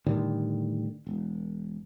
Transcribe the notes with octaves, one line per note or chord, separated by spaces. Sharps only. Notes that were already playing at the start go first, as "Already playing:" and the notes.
A2 D3 D#3 G3
E1